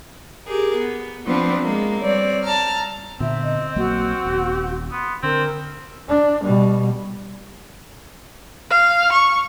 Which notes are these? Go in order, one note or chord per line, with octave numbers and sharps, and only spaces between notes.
G4 G#4 A#4
B3
F3 B3 C4 D4 F4 B4
G#3 A#3 B3
G3 C4 C#5 D5
A5 A#5 F6
A#2 D3 B3 C4 E5
D#5
A#1 F#3 A#3 F#4
D#1
B3 C6
D3 C4 A#4
D4
B2 G3
F5
C#6